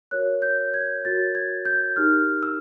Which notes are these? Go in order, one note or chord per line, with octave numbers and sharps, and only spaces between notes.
F#4 A#4 C#5 F#6
G6
G#6
F#4 A#4 C#5 A6
G#6
G6
D#4 G4 A#4 F6
E6